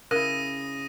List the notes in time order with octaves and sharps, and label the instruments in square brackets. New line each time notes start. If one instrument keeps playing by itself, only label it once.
[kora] C#3 E4 [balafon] A#4 [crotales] D#6 A#6 D#7